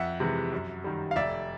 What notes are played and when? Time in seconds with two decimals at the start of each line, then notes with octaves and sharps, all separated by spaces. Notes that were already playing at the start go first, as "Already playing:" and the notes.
Already playing: F2 E5 F#5
0.20 C3 E3 G#3
0.53 F#2
0.84 D#3 G3
1.11 F5
1.16 F1 D5 E5